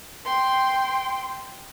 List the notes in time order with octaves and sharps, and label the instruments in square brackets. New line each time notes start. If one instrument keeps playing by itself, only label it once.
[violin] G5 C6